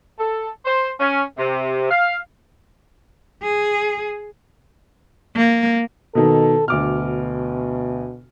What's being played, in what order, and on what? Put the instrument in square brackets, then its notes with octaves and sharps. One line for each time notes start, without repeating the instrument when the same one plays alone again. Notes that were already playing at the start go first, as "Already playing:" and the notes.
[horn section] A4
C5
C#4
C3
F5
[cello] G#4
[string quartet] A#3
[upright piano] B2 D#3 [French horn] A4
[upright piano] D2 D6 F6 [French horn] B2